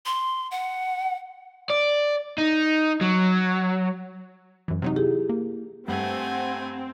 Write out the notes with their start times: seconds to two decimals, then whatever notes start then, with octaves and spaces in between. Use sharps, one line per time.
0.06 C6
0.51 F#5
1.70 D5
2.38 D#4
3.01 F#3
4.68 F#2 E3
4.82 C3 F#3 D#4
4.96 E4 G4 G#4
5.29 A#3
5.88 G2 A3 C4 F#5 G#5